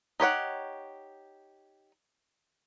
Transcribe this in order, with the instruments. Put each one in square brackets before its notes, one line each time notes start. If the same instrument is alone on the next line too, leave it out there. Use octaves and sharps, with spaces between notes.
[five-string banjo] D#4 G4 C#5 F#5